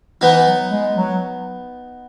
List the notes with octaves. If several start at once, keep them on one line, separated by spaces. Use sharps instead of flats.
E3 B3 D#4
F#3
G#3
F#3